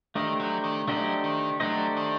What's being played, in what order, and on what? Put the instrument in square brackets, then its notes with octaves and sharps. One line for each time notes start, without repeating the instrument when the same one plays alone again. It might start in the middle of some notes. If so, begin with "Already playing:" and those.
[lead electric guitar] D#3 [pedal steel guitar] A3 D4 G4 C5 D#5
[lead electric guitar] F#3
D#3
[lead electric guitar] F#3 [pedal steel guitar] A3 D4 G4 C5 D#5
[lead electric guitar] D#3
[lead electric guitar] F#3 [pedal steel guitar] A3 D4 G4 C5 D#5
[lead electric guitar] D#3